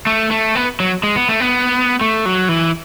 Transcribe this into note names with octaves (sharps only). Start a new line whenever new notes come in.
A3
A3
B3
F#3
G#3
B3
A3
B3
A3
F#3
E3